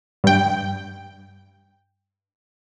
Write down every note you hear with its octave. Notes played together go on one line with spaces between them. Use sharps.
G2 G5